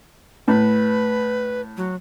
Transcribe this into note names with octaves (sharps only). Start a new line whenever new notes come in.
A2 B4
F#3